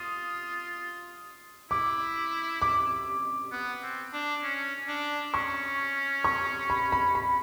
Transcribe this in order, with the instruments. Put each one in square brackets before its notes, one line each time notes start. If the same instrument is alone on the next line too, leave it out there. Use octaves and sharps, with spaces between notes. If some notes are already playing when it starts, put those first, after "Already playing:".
Already playing: [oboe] F4 [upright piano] D#6
[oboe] E4 [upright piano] D6
[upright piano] D6
[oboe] B3
C4
D4
C#4
D4
[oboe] C#4 [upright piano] C#6
[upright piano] C#6
B5
B5
B5